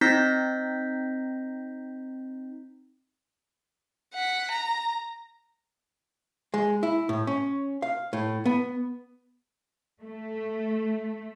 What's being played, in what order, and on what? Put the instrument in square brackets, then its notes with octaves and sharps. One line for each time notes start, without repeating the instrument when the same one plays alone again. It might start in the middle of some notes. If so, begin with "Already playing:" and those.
[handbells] C4 D#4 G6 A#6 B6
[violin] F#5 B6
A#5
[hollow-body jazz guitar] G#3
E4
A2
C#4
F5
A2
B3
[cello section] A3